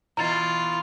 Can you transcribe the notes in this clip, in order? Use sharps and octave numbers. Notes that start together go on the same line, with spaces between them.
B2 E3 E4 F4 A#5 A6